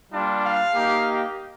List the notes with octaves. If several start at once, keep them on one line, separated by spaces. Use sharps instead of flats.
G3 A#3 D4 F4
F5
A#3 D#4 G4